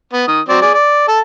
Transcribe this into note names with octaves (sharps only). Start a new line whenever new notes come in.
B3
D#3 D#6
F#3 C4 D5
G#4 D5
D5
A4 A5